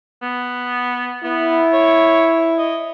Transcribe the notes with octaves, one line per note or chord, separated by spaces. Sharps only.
B3
B3 E4
C#5
D#5